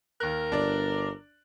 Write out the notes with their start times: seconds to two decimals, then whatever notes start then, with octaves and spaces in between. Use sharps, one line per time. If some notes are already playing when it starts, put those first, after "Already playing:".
0.20 D#2 A#4 F#6
0.52 G1 D4 D5